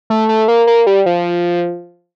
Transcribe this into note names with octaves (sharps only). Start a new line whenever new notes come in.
A3
A3
A#3
A#3
G3
F3